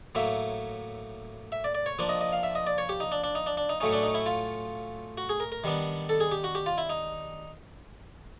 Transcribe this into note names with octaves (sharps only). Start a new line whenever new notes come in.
A2 F#3 A#3 E5
E5
D5
D5
C#5
F3 A#3 D4
D#5
D#5
F5
E5
D#5
D5
C#5
G4
D#4
D4
D4
D#4
D4
D4
D#4
A2 F#3 A3 C#4 D#4
D4
D#4
E4
F4
F#4
G#4
A#4
A#4
D#3 G3 B3 D4
A4
G#4
G4
F#4
G4
F4
E4
D#4